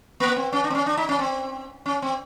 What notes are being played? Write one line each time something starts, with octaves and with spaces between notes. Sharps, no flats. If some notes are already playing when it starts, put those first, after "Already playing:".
A#3
C4
C#4
D4
C4
C#4
D4
D#4
C#4
C4
C#4
C4